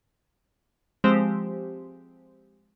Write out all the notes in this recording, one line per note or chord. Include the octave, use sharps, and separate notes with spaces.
F3 G#3 C4 G4 C5